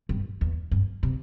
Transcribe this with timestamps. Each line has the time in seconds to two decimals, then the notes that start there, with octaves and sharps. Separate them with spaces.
0.09 G2
0.41 E2
0.71 G2
1.03 C3